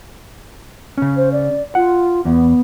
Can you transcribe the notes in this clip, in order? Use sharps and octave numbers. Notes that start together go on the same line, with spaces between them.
C#3 C#4
C5
D5
F4 F#5
E2 B3